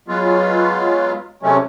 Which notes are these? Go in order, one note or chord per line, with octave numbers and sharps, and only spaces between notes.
F#3 G#3 B3 F4
C3 F#3 G#3 A3 C#4